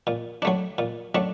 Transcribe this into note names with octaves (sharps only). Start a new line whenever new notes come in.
A#2
F#3 A3 D4
A#2
F#3 A3 D4